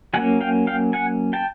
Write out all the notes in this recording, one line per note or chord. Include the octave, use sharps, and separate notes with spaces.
F#3 A#3 C#4 F#5 G#5
F5 G5
F5 G5
F#5 G#5
G5 A5